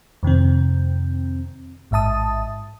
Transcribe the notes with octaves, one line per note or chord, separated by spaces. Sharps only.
F2 C3 D#3 C4
A1 G#2 E5 A5 D#6